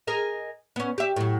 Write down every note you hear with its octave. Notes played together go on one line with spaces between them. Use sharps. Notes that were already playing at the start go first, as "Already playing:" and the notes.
G#4 A#4 D#5
B3 C#4
G4 E5
A2 F#3